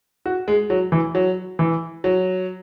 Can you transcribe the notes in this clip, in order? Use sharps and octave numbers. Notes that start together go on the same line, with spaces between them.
F#4
G#3
F#3
E3
F#3
E3
F#3